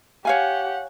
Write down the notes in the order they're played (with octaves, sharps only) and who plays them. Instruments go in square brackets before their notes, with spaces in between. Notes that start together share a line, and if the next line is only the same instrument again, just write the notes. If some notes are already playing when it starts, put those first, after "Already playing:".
[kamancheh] G4 F#5 [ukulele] C#5 F5 G#5